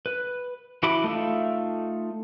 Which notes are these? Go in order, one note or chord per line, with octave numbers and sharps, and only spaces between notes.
B4
E3 E4 F#4 B5 D6
A3 D#4 F4 E5